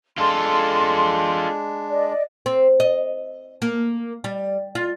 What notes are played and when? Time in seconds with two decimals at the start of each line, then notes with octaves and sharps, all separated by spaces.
0.18 G#3 D4 F4 A4 C6
1.89 D5 D#5
2.46 C4
2.80 D#5
3.62 A#3
4.24 G3
4.75 F4